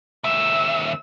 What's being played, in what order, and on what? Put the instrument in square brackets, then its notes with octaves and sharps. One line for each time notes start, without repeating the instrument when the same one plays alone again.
[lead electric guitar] D#2 E5 [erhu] E6